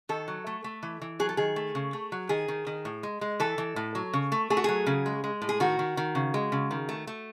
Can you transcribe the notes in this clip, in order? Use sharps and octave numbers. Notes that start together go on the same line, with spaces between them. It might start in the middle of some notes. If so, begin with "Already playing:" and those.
D#3 A4
F#3
A3
A3
E3
E3
F#3 G#4
A4
D#3 G#4
A3
C#3
A3
F#3
D#3 G#4
D#3
D#3
A2
G#3
G#3
E3 A4
E3
A2
F#3
C#3
A3
A3 G#4
F#4
F#3 G#4
C#3
G#3
G#3
A2
G#4
D#3 F#4
D#3
D#3
C#3
G#3
C#3
D#3
A3
A3